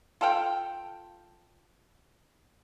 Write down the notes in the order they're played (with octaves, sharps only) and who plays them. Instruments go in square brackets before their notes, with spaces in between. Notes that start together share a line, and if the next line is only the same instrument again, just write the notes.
[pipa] F4 A4 F5 G5